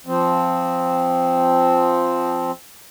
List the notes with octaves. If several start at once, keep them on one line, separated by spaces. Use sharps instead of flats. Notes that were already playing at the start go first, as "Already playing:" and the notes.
F3 C4